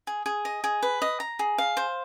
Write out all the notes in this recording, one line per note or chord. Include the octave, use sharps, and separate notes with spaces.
G#4
G#4
D#5
G#4
B4
D#5
A#5
G#4
F5
C5